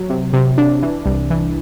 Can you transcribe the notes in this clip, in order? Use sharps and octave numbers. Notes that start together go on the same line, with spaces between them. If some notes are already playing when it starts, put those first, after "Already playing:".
Already playing: F#3
C3
C3
D4
E3
C2
E3